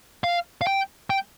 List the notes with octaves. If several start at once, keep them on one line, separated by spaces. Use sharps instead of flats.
F5
F5
G5
G5